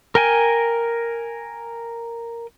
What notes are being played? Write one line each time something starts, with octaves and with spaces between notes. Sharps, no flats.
A#4 G5 G#5